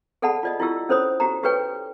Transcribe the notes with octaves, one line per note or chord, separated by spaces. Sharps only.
G#4 A4 D5 F#5 A5 B5
F4 D5 D#5
E4 F4 G4 E6
C#4 A4 C5 C#5 B5 D#6
F#4 G4 A#5
F#4 G4 A4 B4 C#5 G5